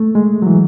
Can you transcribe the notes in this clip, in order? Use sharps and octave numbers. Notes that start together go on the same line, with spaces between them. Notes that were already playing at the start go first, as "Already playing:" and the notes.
Already playing: A3
G#3
F#3
E3